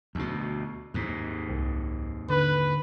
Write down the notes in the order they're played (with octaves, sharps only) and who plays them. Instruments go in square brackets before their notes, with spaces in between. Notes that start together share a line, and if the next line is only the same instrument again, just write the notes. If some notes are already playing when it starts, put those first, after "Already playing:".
[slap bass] D2 B2
D#2 G#2
[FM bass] C2
[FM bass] D3 [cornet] B4